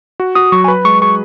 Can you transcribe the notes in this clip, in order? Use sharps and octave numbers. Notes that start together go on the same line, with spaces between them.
F#4
F#4 D#6
F#3 C#6
G#5
B4 B5
G#3 C#6
G#4 C#6